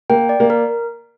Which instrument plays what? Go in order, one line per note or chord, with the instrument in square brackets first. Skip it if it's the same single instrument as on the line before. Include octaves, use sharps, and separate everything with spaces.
[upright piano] A#3 [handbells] G5
[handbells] D5
[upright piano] A#3
[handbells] A#4